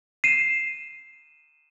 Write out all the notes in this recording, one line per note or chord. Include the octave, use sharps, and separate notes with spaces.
C7 D#7 E7